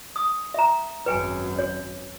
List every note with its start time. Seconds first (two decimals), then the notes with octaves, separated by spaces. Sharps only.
0.16 D#6
0.54 E5 A#5
1.06 G#1 F#2 B4 G5 G#5
1.59 C#5